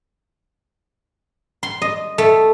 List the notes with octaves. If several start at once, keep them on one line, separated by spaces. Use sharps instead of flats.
C6
D#5
A3